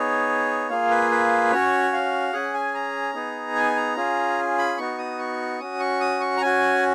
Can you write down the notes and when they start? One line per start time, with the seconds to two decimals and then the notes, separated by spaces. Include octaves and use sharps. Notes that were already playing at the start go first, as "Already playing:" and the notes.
Already playing: B3 D#4 G#4 C#5
0.70 A#3 F4 G#4 F5
0.90 B4
1.11 B4
1.52 C#4 F#4 C#5
1.93 F5
2.33 C#4 G#4 F#5
2.54 G#5
2.74 A#5
3.14 B3 D#4 G#4
3.56 G#5
3.76 A#5
3.96 C#4 F4 G#4
4.58 B5
4.77 B3 D#4 F#4 C#6
4.98 D#6
5.18 C#6
5.59 C#4 F#4 D#6
5.80 C#6
6.01 D#6
6.20 C#6
6.37 A#5
6.41 C#4 F#4 G#5